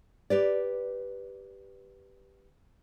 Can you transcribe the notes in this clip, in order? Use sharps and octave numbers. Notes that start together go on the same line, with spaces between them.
G4 B4 D5